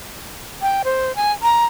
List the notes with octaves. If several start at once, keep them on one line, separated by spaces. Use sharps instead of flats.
G5
C5
G#5
A#5